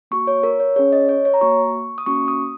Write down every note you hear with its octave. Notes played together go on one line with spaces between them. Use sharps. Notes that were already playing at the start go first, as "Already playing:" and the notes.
A#3 F#4 C#6
C#5
A#4
C#5
C#4 G#4 C#5
D#5
C#5
C#5
A#5
A#3 F#4 C#6
D#6
A#3 C#4 F#4 C#6
D#6